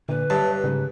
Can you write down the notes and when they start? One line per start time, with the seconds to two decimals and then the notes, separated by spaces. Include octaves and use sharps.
0.09 A#2 D3 B4
0.30 G2 C#5 E5 A5
0.64 G#2 C#3